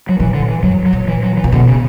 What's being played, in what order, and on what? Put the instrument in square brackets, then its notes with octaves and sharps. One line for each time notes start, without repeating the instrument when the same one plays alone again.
[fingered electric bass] F#3
[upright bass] A#2 [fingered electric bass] E3
[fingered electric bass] D3
E3
[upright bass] G2 [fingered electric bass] F#3
[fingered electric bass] F#3
[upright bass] A#2
[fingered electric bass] E3
F#3
E3
[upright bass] A#2
[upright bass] B2 [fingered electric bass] D3
[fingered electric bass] C#3